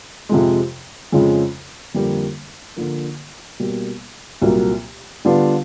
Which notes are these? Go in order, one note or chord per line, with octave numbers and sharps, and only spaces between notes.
F2 C3 F3 G#3
F2 C#3 F3 G#3
F2 D3 G3 A#3
D3 F3 A#3
B2 G3 A#3
C2 A#2 F#3 A#3
D3 G3 B3 D4 F4